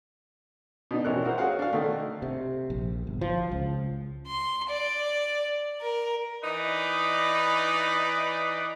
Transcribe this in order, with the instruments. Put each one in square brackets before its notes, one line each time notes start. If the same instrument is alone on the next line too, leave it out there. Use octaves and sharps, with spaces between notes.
[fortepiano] B2 D4 D#4
A1 C#4 A#4 F#6
F#4 A#4 C5
F#4 G#4 C#5 F5 F#5
D4 F5
D3 D#3 A3
[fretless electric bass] C3
A#1
G1
F3
C#2
[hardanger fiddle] C6
D5
A#4
[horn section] E3 D#4 B4 D5